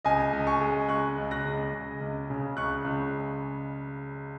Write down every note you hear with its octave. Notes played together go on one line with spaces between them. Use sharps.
C#2 D#5 G#5
C#2
G#5 C#6
G#3
C#2 C#6 F#6
C#2
F#6 A#6
C#2
C#2
C#2
C#3
C#2 C#6 F#6
C#2